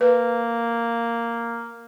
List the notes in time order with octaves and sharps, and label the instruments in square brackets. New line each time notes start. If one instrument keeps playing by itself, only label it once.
[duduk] A#3 [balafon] B4